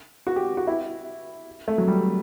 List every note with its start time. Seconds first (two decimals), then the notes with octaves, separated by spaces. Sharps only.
0.27 F#4
0.36 G4
0.57 F#4
0.67 E4
1.68 A3
1.78 F#3
1.88 G3